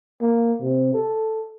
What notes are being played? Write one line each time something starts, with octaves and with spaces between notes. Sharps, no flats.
A#3
C3
A4